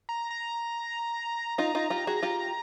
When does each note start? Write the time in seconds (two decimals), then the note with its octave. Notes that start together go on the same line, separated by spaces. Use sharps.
0.09 A#5
0.31 A#5
1.58 D#4 F4 A#5
1.75 D#4 F4
1.90 F4 G4
2.07 F#4 G#4
2.22 F4 G4